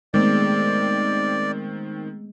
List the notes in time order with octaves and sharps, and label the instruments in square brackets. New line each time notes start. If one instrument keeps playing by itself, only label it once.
[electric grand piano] D#3 C4 [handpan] G#3 A3 B3 [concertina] D5